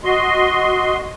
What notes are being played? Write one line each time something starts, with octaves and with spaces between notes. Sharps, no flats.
F#4 D#5 C6